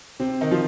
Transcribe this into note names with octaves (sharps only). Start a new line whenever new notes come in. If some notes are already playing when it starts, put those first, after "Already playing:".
C3 C4
D#3 D#4
F3 F4